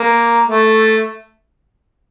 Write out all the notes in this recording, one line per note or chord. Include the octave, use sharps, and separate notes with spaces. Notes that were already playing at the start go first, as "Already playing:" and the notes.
Already playing: A#3
A3